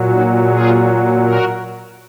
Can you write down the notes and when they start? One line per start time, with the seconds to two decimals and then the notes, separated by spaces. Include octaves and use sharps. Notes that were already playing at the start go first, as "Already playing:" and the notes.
Already playing: A#2 F#3
0.11 D#4 F#4
0.48 F4 G#4
1.23 F#4 A#4